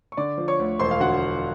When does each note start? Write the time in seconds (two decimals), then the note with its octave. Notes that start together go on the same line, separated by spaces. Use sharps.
0.12 C#6
0.17 D3 D5 D6
0.38 F3
0.48 C#5 C#6
0.59 D2
0.79 E1 C5 C6
0.91 F5
1.00 D3 F#4 F#5